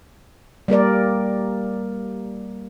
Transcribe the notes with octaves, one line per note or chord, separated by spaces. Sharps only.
G3 A#3 A#4 D5